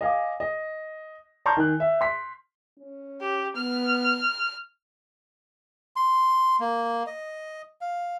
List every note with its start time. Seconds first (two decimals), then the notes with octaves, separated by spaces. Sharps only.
0.01 D#5 F5 G#5 D6
0.40 D#5
1.46 A5 A#5 C6 C#6 F6 G6
1.57 D#3 G#5 F#6
1.80 E5
2.01 C6 B6
2.79 C#4
3.21 G4
3.56 B3 F6
5.96 C6
6.60 A#3
7.07 D#5
7.81 F5